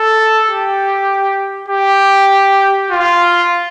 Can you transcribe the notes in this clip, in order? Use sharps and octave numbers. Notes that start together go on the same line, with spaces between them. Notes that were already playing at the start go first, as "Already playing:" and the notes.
Already playing: A4
G4
G4
F4